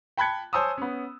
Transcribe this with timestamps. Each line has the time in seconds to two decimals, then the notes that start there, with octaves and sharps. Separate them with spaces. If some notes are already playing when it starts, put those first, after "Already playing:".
0.17 G5 A5 B5 F#6 G#6 C#7
0.53 C5 C#5 G#5 A5 D#6 E6
0.78 B3 C#4